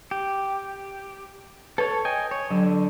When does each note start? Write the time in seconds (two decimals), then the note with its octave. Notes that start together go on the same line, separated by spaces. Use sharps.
0.11 G4
1.78 A4 B4 C#5
2.05 D#5 G5 G#5
2.31 C#5
2.51 D3 F#3